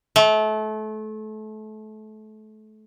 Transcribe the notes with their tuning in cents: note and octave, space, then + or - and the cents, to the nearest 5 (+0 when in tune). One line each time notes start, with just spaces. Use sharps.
A3 -30